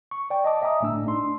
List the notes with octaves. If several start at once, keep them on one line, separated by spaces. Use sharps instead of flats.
C#6
D5 G5
D#5 A5 D6
D#5 E5 G#5 A#5 D#6
G1 A2 A3 D4 E6
D4 D#4 C6